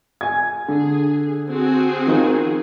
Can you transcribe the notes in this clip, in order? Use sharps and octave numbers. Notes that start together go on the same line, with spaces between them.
G#5 G#6
D3 G#4
C4 F#4 G#4
D#3 F3